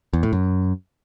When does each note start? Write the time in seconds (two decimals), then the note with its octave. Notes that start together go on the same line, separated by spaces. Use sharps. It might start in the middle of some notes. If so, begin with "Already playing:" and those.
0.13 E2
0.23 A2
0.33 F#2